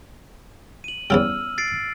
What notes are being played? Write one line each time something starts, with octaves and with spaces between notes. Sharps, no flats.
D#7 F#7
E2 C#3 G3 E6 F6
A6 C7 D7